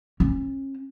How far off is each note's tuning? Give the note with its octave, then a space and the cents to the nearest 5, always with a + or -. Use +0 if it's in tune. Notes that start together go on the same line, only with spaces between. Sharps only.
C#4 -35